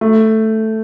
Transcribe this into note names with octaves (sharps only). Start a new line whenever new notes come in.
A3